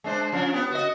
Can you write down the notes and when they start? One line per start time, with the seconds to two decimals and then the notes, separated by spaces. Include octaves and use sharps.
0.04 G#3 D4 C5
0.33 F3 C#4 D4
0.53 G3 B3
0.71 F#4 B4 D#5